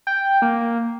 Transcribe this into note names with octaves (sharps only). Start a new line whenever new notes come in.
G5
A#3